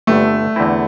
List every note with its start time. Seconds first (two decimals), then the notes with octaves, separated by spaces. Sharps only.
0.07 G1 G2 D3 A3
0.56 E2 D3 C4 E4